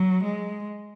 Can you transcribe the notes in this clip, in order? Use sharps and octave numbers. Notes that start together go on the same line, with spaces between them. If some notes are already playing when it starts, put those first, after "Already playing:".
Already playing: F#3
G#3